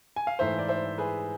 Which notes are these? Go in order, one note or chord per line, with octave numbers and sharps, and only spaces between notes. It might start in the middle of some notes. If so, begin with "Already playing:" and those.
G#5
F5
G#2 E3 A3 C5 E5
D5
C5 E5
G#4 B4